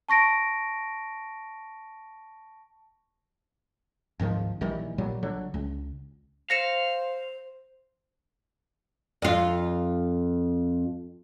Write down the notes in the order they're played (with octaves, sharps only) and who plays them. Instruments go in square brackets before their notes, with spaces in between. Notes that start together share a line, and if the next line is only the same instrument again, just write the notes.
[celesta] A5 C#6 A#6 D7
[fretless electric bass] D1 G#2 D#3 F3
A#1 D#3 E3 G3
A#1 A#2 F#3 G3
D3 F#3
C#2
[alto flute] C5 [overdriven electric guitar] F5 [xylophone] A#6 C#7 E7
[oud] F2 F4